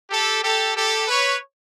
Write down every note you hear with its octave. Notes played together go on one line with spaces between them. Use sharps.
G4 A4
G4 A4
G4 A4
B4 C#5